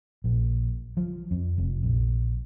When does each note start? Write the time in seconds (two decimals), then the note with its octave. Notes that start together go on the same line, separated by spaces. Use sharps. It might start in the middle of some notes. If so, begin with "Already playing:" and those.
0.24 A#1
0.97 F3
1.31 F2
1.58 F1
1.83 A#1